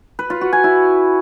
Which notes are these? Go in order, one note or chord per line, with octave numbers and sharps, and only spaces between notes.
B4
F4
F#4
G#5
E4